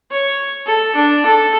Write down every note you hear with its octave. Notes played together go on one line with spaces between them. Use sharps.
C#5
A4
D4
A4